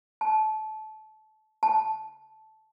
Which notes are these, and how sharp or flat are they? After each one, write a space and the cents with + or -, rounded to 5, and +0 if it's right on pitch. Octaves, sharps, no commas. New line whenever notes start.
A5 -25
A5 -10